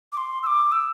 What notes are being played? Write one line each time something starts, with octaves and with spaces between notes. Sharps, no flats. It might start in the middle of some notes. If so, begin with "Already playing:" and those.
D6
C6
E6
D6
E6